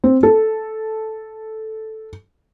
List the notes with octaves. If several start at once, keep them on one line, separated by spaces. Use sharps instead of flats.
C4
A4